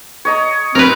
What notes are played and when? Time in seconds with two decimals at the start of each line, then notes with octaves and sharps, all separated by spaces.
0.25 C#5 D#5 A#5
0.75 C4 A#4 B4